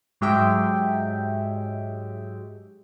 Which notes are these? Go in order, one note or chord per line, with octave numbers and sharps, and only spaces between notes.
G#2 F#3 G#3 G4 E5 G5